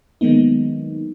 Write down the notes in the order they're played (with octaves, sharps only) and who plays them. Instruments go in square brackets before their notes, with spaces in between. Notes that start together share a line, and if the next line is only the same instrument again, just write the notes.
[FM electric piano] D#3 F#3 G#3 A#3 B3 D#4